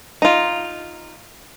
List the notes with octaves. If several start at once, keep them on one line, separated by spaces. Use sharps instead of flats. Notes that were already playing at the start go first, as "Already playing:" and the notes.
D#4 F4